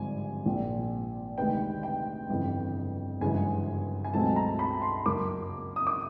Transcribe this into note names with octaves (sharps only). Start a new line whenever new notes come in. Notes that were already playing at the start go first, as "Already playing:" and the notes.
Already playing: G#1 G2 D3 F3 G#5
A#1 A#2 F3
D2 C3 D#3 G#3 B3 G5
G5
G1 F2 C#3 E3
G1 F#2 C#3 E3 G#3 G#5
G#5
C#2 B2 F#3 A3 C4 A5
A#5
B5
C6
F#2 C#3 F#3 A#3 D6
D#6
D6